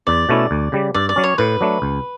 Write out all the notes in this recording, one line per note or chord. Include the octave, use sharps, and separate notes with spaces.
E2 D5
B2 A3 C#4 E4
D2
C#3 G3
G2 D5
D5
F#3 C#4
C#5
A2 B4
F#3 A3 D4
C#2